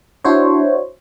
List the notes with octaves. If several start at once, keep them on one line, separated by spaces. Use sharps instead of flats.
D4 E4 F#4 C5 C#5